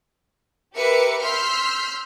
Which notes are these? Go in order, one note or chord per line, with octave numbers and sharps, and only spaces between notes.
G4 A#4 B4 E5 D6 C#7
C6 E6 F6 G6 B6 C7